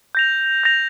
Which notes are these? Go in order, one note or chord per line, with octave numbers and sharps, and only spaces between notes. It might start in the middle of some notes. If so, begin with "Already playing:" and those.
G6 A#6 F7
G6 A#6 F7